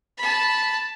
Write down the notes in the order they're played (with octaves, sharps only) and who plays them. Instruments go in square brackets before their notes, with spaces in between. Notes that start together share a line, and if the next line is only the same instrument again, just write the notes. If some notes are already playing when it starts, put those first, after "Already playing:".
[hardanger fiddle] A5 B5